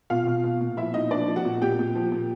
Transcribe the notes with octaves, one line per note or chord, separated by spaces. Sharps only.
B2 F4 F5
B2
B2
A#2
F3 E4 E5
A#2 D#4 D#5
F3 D4 D5
F3
F#4 F#5
A#2
A#2 G4 G5
A#2
F3
A#2